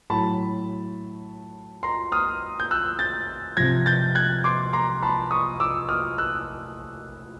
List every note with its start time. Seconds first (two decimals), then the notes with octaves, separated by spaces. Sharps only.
0.10 A2 F#3 A5 B5
1.83 A#5 C6
2.12 D#6 F6
2.60 G6
2.71 E6 F#6
2.99 G6 A6
3.57 C3 F3 G#6 A#6
3.86 G6 A6
4.15 F#6 G#6
4.44 C6 D6
4.73 A#5 C6
5.03 A5 B5
5.31 C#6 D#6
5.60 D6 E6
5.89 D#6 F6
6.18 E6 F#6